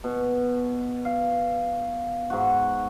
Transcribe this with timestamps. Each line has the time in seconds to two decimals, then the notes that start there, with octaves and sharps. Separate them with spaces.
0.04 B2
1.05 F5
2.30 G#2 F#4